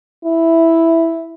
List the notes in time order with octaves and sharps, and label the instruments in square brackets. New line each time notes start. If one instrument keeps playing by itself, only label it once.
[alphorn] E4